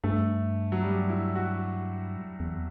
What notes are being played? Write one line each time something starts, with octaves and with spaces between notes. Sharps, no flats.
G2 A3
F#3
G3
E4
F#4
E2